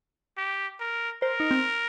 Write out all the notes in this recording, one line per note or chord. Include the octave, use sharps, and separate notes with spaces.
G4
A#4
A#4 C5
D#4
C4